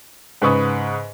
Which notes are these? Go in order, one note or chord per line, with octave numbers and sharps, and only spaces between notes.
G#2 C#3 B4 C#6 D#6